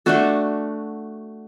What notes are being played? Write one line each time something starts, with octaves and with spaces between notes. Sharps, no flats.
A3 D4 F#4 A4